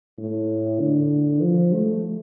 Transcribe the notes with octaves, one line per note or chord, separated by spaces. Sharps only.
A2
D3
F3
A3